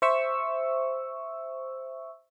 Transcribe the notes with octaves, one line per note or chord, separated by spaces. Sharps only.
C5 E5 C#6 E6